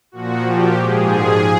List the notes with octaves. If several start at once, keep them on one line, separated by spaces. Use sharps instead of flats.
A#2 F3 F#4
G4
G#2 F3 G#4